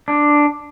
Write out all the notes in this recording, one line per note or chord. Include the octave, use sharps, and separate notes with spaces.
D4